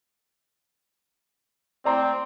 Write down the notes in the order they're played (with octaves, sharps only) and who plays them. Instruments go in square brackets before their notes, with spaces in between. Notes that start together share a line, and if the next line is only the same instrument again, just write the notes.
[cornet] C4 [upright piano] D5 A#5 C6